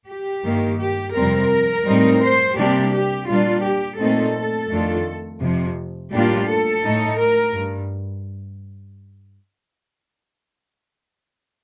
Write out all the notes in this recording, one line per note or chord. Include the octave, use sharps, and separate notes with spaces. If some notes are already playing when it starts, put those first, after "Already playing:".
G4
G2 D#3 A#3
G4
F2 C3 G3 C4 A#4
A2 G3 C4 D#4
C5
C3 G3 A#3 D4 G4
G4
A#2 G3 D4 F4
G4
A#2 A3 C4 D#4 A4
F2 D#3 A3 D4 F4
F2 C3 F3
A2 G3 A#3 D4 F4 G4
A4
A2 A3 D#4
A#4
G2